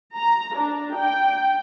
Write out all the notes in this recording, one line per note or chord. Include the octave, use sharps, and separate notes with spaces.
A#5
D4
G5